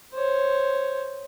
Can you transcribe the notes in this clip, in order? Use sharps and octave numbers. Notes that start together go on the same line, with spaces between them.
C5 C#5